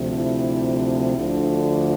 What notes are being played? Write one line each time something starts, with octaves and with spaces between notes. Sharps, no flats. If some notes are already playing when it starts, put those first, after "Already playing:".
Already playing: D2 C3 F3
E4
D2 D3 F3